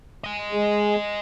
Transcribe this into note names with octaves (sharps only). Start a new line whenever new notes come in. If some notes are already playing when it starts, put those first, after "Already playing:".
D#5 G#5
G#3 G#4